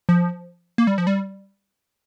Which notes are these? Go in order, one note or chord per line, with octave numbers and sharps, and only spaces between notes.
F3
A#3
G3
F3
G3